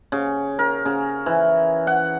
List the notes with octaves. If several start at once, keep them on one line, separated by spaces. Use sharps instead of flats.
C#3
A#4
C#3
E3
F#5